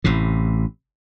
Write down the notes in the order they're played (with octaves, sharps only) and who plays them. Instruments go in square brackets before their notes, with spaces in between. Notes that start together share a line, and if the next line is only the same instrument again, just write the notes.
[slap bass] A1 A2 C3